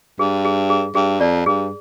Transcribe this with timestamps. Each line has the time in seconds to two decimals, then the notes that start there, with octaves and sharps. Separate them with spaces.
0.19 G2 G#4
0.45 G#4
0.70 G#4
0.95 G2 G#4
1.21 F2 D5
1.46 G2 G#4